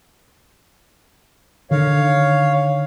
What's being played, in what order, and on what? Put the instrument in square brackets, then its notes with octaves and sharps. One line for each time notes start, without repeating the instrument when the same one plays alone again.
[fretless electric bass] D3 D#3 [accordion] C#5 F5